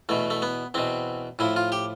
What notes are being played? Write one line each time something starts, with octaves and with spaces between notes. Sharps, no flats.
E2 B2 A3
A3
B3
E2 B2 C4
A2 F3 E4
F4
G4